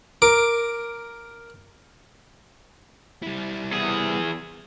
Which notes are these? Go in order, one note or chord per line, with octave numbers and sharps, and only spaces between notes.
A#4 D6
G3 E4
E2 G#4